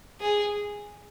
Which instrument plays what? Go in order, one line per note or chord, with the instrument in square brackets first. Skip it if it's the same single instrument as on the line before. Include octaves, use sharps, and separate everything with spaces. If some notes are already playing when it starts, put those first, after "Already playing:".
[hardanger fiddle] G#4